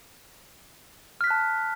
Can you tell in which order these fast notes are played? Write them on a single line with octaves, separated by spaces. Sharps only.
F6 B6 F#6 A5